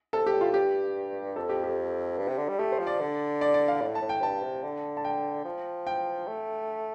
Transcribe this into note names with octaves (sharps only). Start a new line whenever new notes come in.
C3 A4
G4
A2
F4
G2 G4
F2 A4
G4
G4
G2
C3
D3
G3
A3 G4
C5
F3
D5
D3
D5
D5
F5
A2
A5
A2
G5
G2 A5
C3
D3
A5
G5
F3
G5
A3